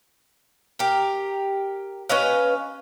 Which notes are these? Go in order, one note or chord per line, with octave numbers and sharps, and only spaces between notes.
G4 A#4
C#4 B4 D#5 F5